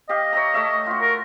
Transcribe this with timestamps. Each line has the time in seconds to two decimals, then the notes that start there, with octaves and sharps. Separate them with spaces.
0.09 G4 D#5 F5
0.33 C#5 E5 A#5
0.54 A3 C#5 E5
0.86 F4 F#4
1.01 A#4